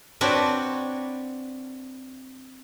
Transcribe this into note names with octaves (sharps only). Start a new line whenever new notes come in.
C4 D4 F#4 B4 C#5 D5